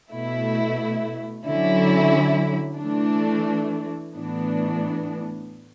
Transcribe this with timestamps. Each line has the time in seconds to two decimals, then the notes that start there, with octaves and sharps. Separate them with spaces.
0.12 B2 A3 E4
1.46 D3 F#3 C#4 E4
2.79 E3 A3 D4
4.13 A2 E3 B3 D4